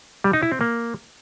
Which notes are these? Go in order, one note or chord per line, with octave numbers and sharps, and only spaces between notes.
G3
D#4
E4
C4
A#3